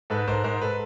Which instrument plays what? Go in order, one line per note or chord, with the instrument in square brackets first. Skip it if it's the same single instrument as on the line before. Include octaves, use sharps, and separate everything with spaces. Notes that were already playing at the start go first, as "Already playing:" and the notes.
[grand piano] G#2 A4 B4
G#2 A#4 C5
G#2 A#4 C5
A4 B4